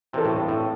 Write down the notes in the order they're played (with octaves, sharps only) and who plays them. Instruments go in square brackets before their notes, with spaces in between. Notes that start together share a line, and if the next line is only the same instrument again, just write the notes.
[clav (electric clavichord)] C3 [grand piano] E3 C4 E4 A4
[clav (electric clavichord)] A2
G2
A2